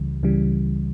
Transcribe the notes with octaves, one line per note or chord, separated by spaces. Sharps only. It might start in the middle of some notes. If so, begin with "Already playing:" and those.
Already playing: C#2 C#3 E3 G3
C#2 C#3 E3 G3